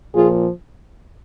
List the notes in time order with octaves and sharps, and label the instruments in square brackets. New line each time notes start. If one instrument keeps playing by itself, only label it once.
[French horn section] A#2 F3 F4 G#4